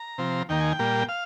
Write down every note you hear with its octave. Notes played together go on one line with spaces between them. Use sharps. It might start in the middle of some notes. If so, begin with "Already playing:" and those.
Already playing: A#5
C3 F3 C4
D#2 D#3 A#3 G5
G#5
G5
A#2 G3 A#3
F5